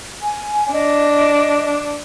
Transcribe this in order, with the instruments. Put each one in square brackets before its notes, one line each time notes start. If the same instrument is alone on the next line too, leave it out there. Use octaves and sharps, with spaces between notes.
[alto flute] G#5
[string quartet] D4 [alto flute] D#5